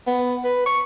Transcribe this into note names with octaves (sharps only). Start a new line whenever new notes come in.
B3
B4
C#6